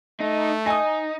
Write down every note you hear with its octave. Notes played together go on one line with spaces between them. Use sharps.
A3 D#4
D#4 G#5 D#6